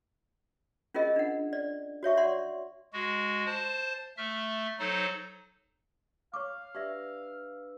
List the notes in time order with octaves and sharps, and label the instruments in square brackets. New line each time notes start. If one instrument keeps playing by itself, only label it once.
[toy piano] C#4 F4 G#4 A#4 D#5
D4 F#5
D5
F#4 C#5 E5 C#6
D5 F#5 C6
[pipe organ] G#3 F#4
C5 A5
A3 E5 F6
F#3 D#4 A4 C5
[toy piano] C#5 C#6 D6 [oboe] F5
[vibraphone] D4 B4 E6 [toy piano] G4 D5 E5